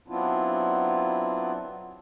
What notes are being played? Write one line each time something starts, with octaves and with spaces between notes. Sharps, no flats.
F#3 B3 C4 D4 E4 F4